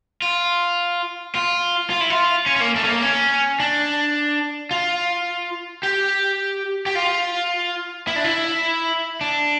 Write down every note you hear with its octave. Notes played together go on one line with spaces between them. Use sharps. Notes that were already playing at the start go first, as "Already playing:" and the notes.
F4
F4
F4
E4
F4
C#4
C#4
A#3
A3
C#4
A#3
C#4
D4
F4
G4
G4
F4
E4
D4
E4
D4